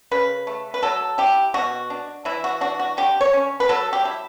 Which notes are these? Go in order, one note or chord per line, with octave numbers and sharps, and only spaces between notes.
C#3 B4
A3
B4
F#3 A4
E4 G4
B2 F#4
D4
E3 E4
F#4
D4 F#4
F#4
D3 G4
C#5
C#4
B4
F#3 A4
G4
E4